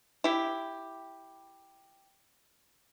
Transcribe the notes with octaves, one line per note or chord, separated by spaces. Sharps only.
E4 G4